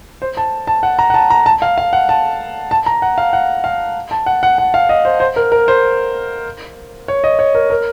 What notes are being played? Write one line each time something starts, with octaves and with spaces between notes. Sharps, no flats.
C5
A5
A5
F#5
A#5
F#5
A5
A#5
A5
F5
F5
F#5
A5
A5
A#5
F#5
F5
F#5
F5
A5
F#5
F#5
F#5
F5
D#5
C5
C5
A#4
A#4
C5
C#5
D#5
C#5
A#4
A#4